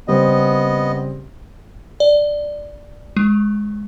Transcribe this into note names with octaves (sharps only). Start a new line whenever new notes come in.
C#3 G3 B3 C4 D#5
D5
G#3